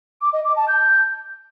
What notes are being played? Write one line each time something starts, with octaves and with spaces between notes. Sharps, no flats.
D6
D#5
D6
A5
G6